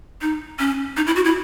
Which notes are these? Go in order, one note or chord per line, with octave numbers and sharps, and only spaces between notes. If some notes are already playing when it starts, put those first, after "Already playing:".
D#4
C#4
D#4
E4
F#4
E4